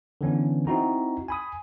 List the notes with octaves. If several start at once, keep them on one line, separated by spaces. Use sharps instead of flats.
D3 E3 B3 C#4
C4 D#4 E4 F#4 A#5
G#5 B5 D#6